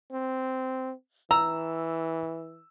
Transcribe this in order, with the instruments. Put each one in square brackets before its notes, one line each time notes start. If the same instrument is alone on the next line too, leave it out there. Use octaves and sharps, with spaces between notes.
[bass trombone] C4
[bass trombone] E3 [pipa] A#5 [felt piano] E6